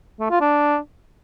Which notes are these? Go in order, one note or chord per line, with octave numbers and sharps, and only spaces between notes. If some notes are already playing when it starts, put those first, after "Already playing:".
A3
F4
D4